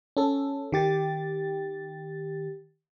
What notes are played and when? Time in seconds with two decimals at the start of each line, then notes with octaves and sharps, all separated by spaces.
0.17 C#4 A4
0.72 D#3 G4 A6